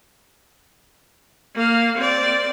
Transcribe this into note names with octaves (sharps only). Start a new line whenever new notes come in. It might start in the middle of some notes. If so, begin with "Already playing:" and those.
A#3 F5
C4 D5